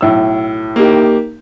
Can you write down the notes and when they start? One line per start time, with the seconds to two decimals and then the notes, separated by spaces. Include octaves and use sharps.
0.01 B1 A2 E6
0.76 A#3 D#4 G4